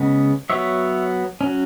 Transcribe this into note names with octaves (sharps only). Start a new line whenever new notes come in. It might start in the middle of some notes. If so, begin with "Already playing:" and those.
Already playing: C#3 G#3 B3
F#3 B3 C#5 E5
F#3 C#4